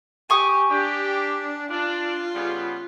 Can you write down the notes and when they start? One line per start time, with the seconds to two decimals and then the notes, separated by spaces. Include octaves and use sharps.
0.30 G4 G#5 C#6 D#6
0.70 D4 G4
1.71 D4 F4
2.35 C#3 G3 B3